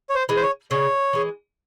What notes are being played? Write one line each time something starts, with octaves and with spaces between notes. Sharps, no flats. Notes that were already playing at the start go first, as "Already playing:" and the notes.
C#5
C5
E3 G#3
C5
C#5
C#3 C#5
E3 G#3